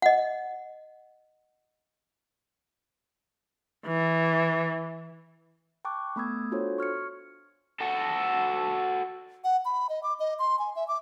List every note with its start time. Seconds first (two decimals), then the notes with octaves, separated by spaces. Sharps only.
0.02 D#5 F#5
3.86 E3
5.85 G5 A5 C#6 D6 F#6
6.16 A3 B3 B5 D#6 E6 G#6
6.52 D4 F4 F#4 A4 C5 C#5
6.78 C#6 F6 G#6 C#7
7.80 F#4 A4
9.44 F#5
9.65 B5
9.89 D#5
10.03 D6
10.20 D#5
10.39 C6
10.59 G#5
10.76 E5
10.88 D6